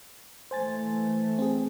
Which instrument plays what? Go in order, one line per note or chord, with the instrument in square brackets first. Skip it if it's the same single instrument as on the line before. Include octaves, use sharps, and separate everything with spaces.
[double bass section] E3 A3 [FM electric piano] C5 G#5 A6
[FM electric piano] C4 G#4